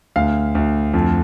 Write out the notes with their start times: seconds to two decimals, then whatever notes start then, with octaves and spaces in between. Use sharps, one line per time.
0.16 D2 F5
0.55 D2
0.94 F2